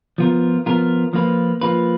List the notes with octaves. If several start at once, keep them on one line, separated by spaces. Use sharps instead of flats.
F3 B3 F4 A#4
F3 B3 F4 A#4
F3 A#3 F4 B4
F3 A#3 F4 B4